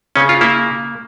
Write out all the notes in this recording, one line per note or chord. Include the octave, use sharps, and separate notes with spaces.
C#3 C#4
F4
A#3 E4